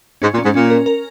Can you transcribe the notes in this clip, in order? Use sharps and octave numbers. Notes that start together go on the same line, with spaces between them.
G#2 C#4
A#2
C#4
G#2
A#2 C#4
A#4
A#4